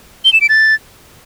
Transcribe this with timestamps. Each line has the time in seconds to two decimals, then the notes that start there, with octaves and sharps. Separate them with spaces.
0.25 G7
0.33 E7
0.41 D7
0.49 A6